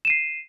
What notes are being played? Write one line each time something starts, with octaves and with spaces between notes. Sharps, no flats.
C7 D#7 E7